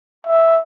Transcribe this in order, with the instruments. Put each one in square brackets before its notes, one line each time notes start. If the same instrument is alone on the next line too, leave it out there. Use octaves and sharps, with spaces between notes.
[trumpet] E5